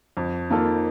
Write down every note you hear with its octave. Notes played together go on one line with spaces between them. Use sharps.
F2
D#3 A#3 F4 A4